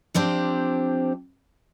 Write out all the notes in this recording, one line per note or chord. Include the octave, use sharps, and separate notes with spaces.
F3 C4 D4 G4 C5